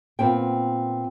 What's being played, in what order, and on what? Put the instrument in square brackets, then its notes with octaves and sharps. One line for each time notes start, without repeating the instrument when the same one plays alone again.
[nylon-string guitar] A#2 B3 C4 G5